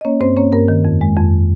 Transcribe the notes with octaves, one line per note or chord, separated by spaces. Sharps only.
D#5
A#3 C#4 C#5
G2 C4 C5
A#3 C#4 C#5
G2 A#3 A#4
D#3
F2
G#3
F2